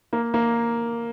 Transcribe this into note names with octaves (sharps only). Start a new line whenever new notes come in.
A#3
A#3